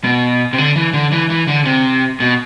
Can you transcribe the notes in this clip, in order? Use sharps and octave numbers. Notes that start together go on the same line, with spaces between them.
B2
C3
D3
E3
D3
E3
E3
D3
C3
B2